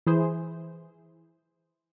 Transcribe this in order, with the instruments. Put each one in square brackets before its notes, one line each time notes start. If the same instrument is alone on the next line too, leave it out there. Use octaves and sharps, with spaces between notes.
[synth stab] E3 E4 G#4 C5